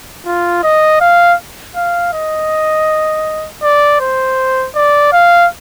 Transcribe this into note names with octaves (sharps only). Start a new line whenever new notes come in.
F4
D#5
F5
F5
D#5
D5
C5
D5
F5